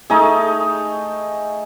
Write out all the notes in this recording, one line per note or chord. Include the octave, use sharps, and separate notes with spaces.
A3 D#4 G#4